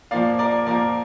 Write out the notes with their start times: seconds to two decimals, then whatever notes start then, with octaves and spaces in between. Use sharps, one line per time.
0.11 A#2 F3 A#3 D5 F5
0.39 A#4 D5
0.67 A#2 F3 A#3 A#4 D5